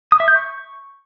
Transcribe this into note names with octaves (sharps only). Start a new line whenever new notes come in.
D#6
E5
G6
C#6